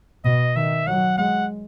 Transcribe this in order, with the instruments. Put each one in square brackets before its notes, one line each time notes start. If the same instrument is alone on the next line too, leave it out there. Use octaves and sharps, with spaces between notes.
[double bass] B2 [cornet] D#5
[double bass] D#3 [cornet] E5
[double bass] F#3 [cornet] F#5
[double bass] G#3 [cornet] F#5